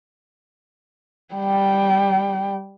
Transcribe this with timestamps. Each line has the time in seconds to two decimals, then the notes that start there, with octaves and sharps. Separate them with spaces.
1.35 G3 G5